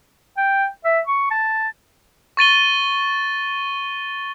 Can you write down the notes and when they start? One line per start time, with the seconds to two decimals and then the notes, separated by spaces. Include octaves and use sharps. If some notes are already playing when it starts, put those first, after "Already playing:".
0.37 G5
0.85 E5
1.07 C#6
1.31 A5
2.37 C#6 A6 D#7 G7